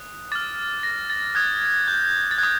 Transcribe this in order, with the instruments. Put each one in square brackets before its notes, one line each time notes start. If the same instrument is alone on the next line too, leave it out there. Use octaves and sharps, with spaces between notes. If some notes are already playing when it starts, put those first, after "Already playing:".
Already playing: [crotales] D#6 F#6
D6 F6 A6
A#6
A6
D#6 F#6 G#6
G6
A6
D#6 F#6 G#6